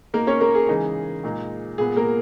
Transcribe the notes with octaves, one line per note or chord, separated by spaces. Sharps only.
B2 A#3 D#4 A#4
C#4 C#5
A#3 A#4
G#4
C#3 E3 G#3 D#4
A#2 G#3 D#4
A#2 G#3 B3 G#4
A#3 A#4